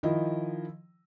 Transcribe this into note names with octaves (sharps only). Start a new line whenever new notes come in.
D#3 F3 E4 D#5